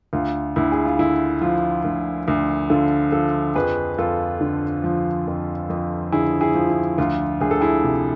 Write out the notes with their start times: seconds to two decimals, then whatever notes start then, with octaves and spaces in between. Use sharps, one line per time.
0.13 D2 F4
0.56 D2 E4
0.72 G#4
0.85 F4
0.99 D3 E4
1.41 F3 F4
1.84 D2
2.28 D2
2.70 D3 F4 A4
3.12 F3 F4 A4
3.55 F2 G#4 B4
3.98 F2 F4 A4
4.41 D3
4.84 F3
5.27 F2
5.70 F2
6.12 D3 E4 G#4
6.41 E4 G#4
6.55 F3
6.70 E4
6.98 D2 F4
7.41 D2 G#4
7.51 A4
7.61 E4 G#4
7.84 C3